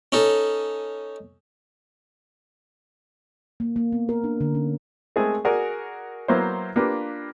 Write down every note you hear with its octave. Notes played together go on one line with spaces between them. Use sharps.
C#4 D#4 A4
A#3
A#3
B3
A#4
D4
D3
C#4
G#3 A3 C4 G#4 A#4
F#4 G#4 A#4 D5
F#3 A#3 B3 E4 C5
A#3 D4 F4 G4 B4